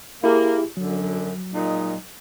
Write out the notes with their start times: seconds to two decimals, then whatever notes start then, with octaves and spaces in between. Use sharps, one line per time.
0.24 A#3 E4 G4 G#4
0.77 F#2 D3 F#3
1.54 A#2 G#3 D#4